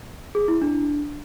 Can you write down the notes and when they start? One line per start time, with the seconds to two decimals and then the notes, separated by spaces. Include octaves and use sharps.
0.35 G#4
0.48 E4
0.62 D4